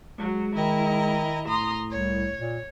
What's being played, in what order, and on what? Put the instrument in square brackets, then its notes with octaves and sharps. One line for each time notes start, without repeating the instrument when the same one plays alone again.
[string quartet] F#3 [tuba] G#3
[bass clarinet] D#3 [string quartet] E4 D#5 A#5
[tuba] A2 [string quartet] A#5 C6 D#6
[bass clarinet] C2 [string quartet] C#5
[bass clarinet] A#2